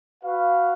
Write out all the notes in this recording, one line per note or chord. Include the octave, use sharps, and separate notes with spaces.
F#4 B4 F5